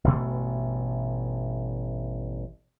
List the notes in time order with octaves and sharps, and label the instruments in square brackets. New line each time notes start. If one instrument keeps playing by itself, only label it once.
[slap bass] A1 G2 B2 A3